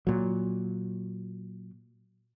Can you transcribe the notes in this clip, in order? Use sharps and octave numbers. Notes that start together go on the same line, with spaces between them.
A#2 F#3